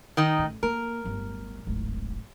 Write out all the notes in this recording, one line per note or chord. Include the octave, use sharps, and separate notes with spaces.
D#3 D#4
A1 A2
A#3 A#4
D1 G1
D1 G#1